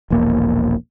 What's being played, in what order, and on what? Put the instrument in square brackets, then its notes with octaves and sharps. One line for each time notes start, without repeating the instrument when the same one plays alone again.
[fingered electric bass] E1 A#1 E2 A#3